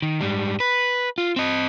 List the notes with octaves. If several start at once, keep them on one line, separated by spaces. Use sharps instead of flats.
D#3
G#2 G3
B4
F4
C4 D#5